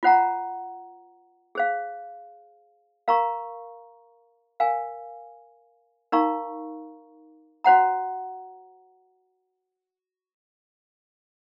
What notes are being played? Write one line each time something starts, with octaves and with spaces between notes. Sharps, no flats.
F4 C5 F#5 A#5
G#4 C5 F5
A#4 F5 A#5 C#6
A#4 F5 G#5
D#4 A#4 F5 A#5 C#6
F#4 C5 F#5 A#5